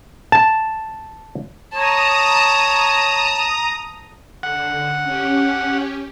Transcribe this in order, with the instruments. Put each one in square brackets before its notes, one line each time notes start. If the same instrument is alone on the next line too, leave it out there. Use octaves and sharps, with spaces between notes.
[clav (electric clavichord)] A5
[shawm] C#5 [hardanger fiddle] A5 [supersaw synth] A#5 D#6
[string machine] D3 [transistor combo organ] F#5
[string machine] C#4 G4